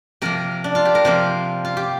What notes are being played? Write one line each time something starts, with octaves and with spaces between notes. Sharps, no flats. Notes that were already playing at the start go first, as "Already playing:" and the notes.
C3 F3 A#3 A#4
D4
F4
G4
A#4
C3 F3 A#3 C5
F4
G4